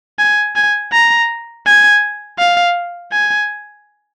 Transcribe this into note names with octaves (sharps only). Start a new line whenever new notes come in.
G#5
G#5
A#5
G#5
F5
G#5